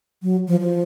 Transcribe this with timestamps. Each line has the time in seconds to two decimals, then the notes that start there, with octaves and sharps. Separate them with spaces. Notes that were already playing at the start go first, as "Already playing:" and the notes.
0.23 F#3
0.48 F3
0.60 F3